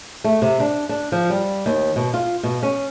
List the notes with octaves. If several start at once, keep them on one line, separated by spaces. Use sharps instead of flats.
A3
C3
D4
D4
F3
G3
D#2
B2
F4
B2
C#4